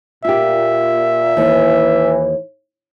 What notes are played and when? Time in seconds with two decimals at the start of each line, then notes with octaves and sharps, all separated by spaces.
0.25 A#2 F4 G4 E5
1.37 D#2 E3 D5